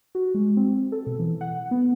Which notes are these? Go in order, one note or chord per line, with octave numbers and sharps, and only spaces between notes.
F#4
G#3
C4
A4
B2
E3
F#5
B3